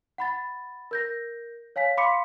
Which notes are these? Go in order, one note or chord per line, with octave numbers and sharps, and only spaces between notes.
F#5 B5 A6
A#4 G6 A#6
C#5 F5 G#5 B6
F5 B5 C6 D6 B6 C#7